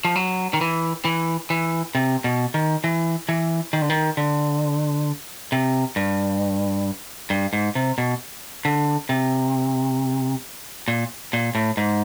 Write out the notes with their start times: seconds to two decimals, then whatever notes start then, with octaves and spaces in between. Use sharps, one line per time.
0.05 F3
0.16 F#3
0.53 D#3
0.61 E3
1.05 E3
1.50 E3
1.95 C3
2.24 B2
2.54 D#3
2.84 E3
3.29 E3
3.73 D#3
3.82 D3
3.90 D#3
4.17 D3
5.52 C3
5.96 G2
7.30 G2
7.53 G#2
7.75 C3
7.98 B2
8.65 D3
9.09 C3
10.88 A#2
11.33 A#2
11.55 A2
11.77 G#2